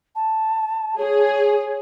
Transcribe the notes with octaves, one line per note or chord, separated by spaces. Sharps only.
A5
G#4 C#5